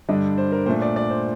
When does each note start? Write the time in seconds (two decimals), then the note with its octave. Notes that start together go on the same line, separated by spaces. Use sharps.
0.09 G2 D3 G3 D4 D#5
0.38 C5
0.52 A#4
0.66 A#2 C5
0.69 A3 D4
0.82 D5
0.96 D5
1.10 C5